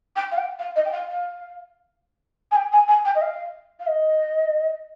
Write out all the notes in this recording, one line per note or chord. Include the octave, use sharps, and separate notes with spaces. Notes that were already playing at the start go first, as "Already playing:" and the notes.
G5
F5
G5
F5
D#5
G5
F5
F5
G#5
G5
G#5
G#5
G5
D#5
F5
F5
D#5